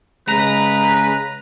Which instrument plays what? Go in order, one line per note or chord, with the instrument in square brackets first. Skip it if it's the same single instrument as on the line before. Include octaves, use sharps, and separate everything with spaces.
[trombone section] C#3 G#3 [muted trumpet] B4 [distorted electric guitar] A#5